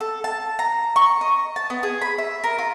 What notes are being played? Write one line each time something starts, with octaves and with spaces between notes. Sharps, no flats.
A4
A5
A#5
C#6
D#5
A5
B3
G#4
B5
E5
A#4
F4